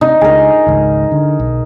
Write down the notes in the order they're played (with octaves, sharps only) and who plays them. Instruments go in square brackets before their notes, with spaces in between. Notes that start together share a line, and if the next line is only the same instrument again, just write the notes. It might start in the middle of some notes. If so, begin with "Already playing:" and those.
[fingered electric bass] C3 [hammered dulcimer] D#4
[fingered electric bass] C#2 [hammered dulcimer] G#4 A#4
[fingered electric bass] G#1 C#2
D3
B1